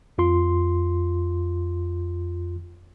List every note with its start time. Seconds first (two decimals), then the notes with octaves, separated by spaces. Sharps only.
0.18 F2 F4 C6